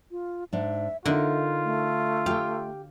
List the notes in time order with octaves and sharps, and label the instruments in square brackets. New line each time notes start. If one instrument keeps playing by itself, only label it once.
[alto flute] F4
[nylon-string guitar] G#2 D4 [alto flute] E5
[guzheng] D3 [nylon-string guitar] D#4 A#4 [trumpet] F4 [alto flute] E5
[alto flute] A3
[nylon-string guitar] G4 G5 [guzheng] F5